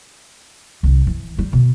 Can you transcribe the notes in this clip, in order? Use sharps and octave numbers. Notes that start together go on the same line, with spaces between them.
C2
E3
G3
B2